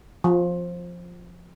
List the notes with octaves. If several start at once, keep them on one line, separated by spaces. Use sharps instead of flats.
F3